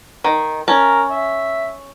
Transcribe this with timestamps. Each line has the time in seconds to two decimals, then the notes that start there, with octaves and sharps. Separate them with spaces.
0.24 D#3
0.68 C#4 A#4 A5
1.11 E5